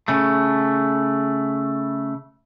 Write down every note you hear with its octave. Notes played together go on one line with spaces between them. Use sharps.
C#3 A3